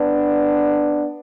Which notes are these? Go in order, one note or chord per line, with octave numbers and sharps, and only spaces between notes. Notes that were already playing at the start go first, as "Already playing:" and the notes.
Already playing: B3 D4